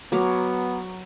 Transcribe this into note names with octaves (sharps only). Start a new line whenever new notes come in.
F#3 B3 A#4 D6